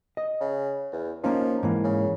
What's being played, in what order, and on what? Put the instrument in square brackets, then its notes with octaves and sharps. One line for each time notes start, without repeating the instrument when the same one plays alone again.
[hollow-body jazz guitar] D#5
[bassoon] C#3
E2
[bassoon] F3 [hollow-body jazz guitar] A#3 C#4 D#4
[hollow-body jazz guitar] G#2 E3 A#3
[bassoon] C#3